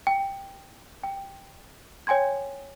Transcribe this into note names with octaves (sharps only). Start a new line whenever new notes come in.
G5
G5
C#5 G5 G#5 C6 G#6